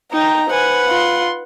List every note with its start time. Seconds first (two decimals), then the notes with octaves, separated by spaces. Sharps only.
0.12 D#4 G5 A#5
0.50 B4 C5 F#5 G#5
0.89 F4 C6